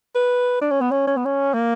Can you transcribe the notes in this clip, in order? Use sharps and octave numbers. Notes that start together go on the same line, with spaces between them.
B4
D4
C#4
B3
C#4
C#4
B3
C#4
A#3